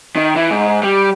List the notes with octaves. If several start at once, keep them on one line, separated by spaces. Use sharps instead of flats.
D#3
E3
G#2
G3